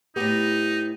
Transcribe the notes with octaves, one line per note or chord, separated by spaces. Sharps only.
A2 B3 D#4 G4